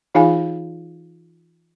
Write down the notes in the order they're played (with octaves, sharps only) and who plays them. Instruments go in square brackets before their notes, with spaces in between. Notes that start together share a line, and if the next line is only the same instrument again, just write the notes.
[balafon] E3 D#4 F4 G#4 F5 G#5